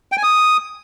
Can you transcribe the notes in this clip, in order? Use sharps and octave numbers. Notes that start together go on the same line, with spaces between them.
G5
G#5
D#6